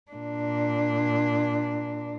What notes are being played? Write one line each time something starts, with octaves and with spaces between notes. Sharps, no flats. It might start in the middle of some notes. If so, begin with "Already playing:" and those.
A#2 D4